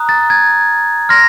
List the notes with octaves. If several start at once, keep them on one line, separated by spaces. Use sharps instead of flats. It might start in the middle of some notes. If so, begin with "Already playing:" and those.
Already playing: A#5 D#6 F#6
A6
G#6
C6 F6 A#6